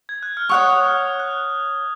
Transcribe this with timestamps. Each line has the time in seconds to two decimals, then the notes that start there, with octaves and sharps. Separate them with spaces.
0.09 G#6
0.23 F#6
0.37 F6
0.49 C#5 F#5 C#6 D#6
0.84 F6
1.20 F#6